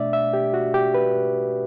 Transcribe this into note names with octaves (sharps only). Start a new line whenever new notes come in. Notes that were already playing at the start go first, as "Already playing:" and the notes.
Already playing: B2 A3 D4 D5 E5
E5
G4
F#4
G4
B4